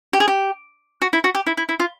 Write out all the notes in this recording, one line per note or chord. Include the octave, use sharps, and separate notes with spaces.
G4
G#4
G4
F#4
E4
F#4
G4
E4
E4
E4
F4